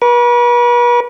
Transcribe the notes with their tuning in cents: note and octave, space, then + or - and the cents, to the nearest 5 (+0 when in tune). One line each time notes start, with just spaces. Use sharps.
B4 -40 C#6 +45